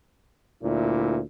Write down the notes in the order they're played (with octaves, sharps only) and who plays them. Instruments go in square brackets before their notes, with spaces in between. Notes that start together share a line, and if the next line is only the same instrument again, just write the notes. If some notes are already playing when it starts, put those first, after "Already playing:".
[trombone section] D2 A#2 E4